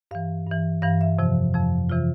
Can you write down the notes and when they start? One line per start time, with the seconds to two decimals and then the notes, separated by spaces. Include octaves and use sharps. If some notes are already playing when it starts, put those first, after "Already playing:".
0.11 G2 E3 F5
0.47 G2 E3
0.82 G2 E3 F5
1.01 E5
1.18 F2 C3 F3
1.54 F2 C3 F3
1.89 C3 E3 F4